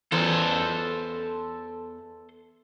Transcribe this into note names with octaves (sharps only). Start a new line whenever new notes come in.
E2 A4 C5